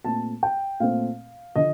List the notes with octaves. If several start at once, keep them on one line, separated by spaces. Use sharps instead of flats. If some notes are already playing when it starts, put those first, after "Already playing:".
A#2 A3 C4 A5
G5
A#2 A3 C4 F5
D3 F3 D#5